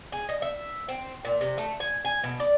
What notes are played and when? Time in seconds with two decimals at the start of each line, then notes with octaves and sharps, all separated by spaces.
0.12 G#4
0.29 D#5
0.42 E5
0.89 C4
1.25 A#2
1.41 C3
1.58 A3
1.80 G#5
2.05 G#5
2.24 B2
2.40 D5